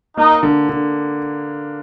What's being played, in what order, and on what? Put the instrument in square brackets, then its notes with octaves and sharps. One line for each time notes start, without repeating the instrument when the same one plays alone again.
[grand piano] A#3 [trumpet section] D#4
[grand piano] D3
D3